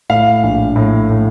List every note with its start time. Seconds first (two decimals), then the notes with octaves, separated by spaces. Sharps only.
0.10 A2 F5
0.43 A#1
0.76 A2
1.09 A2